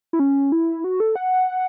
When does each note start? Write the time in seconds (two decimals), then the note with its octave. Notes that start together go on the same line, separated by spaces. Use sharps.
0.13 E4
0.19 C#4
0.52 E4
0.84 F#4
1.00 A4
1.16 F#5